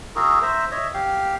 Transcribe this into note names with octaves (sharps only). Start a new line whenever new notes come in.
E4 F#4 G#4 A#4
C5 E5 A#5
C#5 D#5 E5
G4 F5